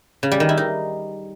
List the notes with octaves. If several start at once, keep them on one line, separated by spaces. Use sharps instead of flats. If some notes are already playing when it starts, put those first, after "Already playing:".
C#3
G3
D#3
E4
D#4